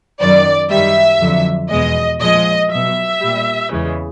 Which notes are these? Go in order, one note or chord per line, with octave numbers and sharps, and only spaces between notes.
F#2 D#3 F#3 D5
F#2 D#3 G3 E5
F2 D3 F#3
E2 B2 G#3 D#5
A#2 F3 G#3 D#5
B2 F#3 E5
A#2 G3
E2 C#3 E3 G#3